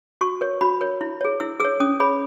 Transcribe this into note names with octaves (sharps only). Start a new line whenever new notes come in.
F#4 C#6
A#4 C#5
F#4 B5
A#4 C#5
E4
G#4 C#5
E4 E6
G#4 C#5 E6
C#4 D#6
G#4 C#5 B5